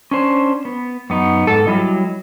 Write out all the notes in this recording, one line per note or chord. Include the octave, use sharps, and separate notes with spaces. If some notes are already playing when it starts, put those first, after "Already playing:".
C#4 D4 C5
B3
F#2 B3 D#4
G#2 A4
F#3 G3 E4 D#5